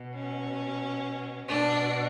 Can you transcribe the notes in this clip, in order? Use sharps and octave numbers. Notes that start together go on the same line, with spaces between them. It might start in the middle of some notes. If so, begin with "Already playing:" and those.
Already playing: B2
C#4
B2 D4